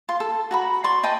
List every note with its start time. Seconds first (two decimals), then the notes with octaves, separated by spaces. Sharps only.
0.09 F4 C6
0.20 A4
0.51 F#4 A#5 B5
0.84 D5 C6 C#6
1.03 B4 D#5 G5 A5